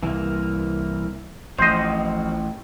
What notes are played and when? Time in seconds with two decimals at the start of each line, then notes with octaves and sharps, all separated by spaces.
0.03 C2 E3 A#3
1.58 A1 F3 C4 F#4 C5 D#5